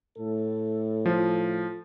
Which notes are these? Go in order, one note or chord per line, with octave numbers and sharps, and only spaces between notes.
A2 A4
F3